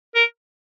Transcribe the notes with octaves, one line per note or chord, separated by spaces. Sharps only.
A#4